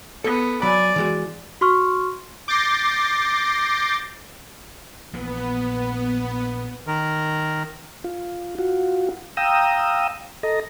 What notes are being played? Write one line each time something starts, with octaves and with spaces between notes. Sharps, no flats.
B3 A4
F#3 D5 G#5 B5
E3 G#3 F#4
F#4 C6 C#6 F6
D6 G6 A6 A#6 C7
A#1 A#2 E3 B3
D#3 A#4
F4
F4 F#4
F5 G5 A#5 D#6 E6
A4 D#5 A#5